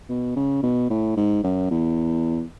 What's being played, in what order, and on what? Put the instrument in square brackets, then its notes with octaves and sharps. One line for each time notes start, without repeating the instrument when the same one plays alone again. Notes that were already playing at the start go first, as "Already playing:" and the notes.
[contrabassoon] B2
C#3
B2
A2
G#2
F#2
E2